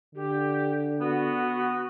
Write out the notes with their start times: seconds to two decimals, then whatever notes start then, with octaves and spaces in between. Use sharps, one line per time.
0.15 D3 G4
1.00 B3 F#4